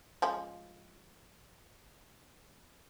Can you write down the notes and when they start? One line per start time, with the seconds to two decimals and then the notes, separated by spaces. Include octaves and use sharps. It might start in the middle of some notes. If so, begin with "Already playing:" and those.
0.22 F3 G#3 C#4